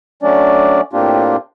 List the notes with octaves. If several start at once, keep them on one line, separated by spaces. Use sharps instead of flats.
F#3 A3 C#4 D4 D5
A2 A#3 C4 D4 F4 G4